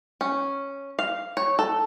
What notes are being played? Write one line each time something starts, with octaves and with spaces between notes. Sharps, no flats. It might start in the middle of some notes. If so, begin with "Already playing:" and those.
C#4
F5
C#5
A4